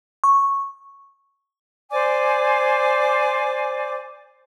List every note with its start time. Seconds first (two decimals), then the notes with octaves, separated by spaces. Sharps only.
0.24 C#6
1.91 C5 D5 G#5 D6